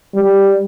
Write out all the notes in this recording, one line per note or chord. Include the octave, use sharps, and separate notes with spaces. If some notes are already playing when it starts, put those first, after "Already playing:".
G3